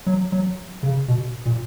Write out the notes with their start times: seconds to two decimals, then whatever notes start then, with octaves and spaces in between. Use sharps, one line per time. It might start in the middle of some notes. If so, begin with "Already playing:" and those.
0.06 F#3
0.32 F#3
0.83 C#3
1.08 B2
1.46 A#2